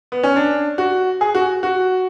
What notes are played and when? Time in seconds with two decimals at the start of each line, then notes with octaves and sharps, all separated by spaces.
0.12 B3
0.23 C#4
0.36 D4
0.78 F#4
1.21 G#4
1.35 F#4
1.63 F#4